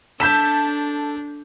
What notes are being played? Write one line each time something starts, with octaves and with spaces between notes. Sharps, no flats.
D4 A4 G6 B6 E7